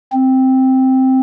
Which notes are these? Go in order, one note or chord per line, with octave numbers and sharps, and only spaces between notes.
C4